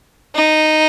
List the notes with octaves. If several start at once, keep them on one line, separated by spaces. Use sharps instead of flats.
D#4